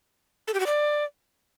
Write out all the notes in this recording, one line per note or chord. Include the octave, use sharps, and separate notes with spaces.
A4
G4
F#4
D5